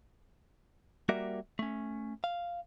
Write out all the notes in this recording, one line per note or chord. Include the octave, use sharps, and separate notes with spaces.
G3 A#3 F#4 A#4 D5 E5
A3 C#4
F5